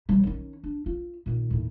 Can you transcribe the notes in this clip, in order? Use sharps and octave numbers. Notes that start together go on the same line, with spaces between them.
E3 G3
D#3 C#4
D4
F4
A#2 D#3
D#2 A2